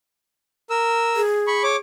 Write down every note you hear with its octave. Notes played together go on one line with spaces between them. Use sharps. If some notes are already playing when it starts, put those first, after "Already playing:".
A#4 E6
G#4
B5 C#6
C#5 D6